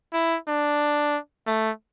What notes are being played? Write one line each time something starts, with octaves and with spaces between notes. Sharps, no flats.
E4
D4
A3